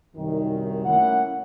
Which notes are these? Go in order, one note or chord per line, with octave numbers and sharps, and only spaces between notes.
C2 F#2 D#3
A3 A#3 C#4 E4 F#5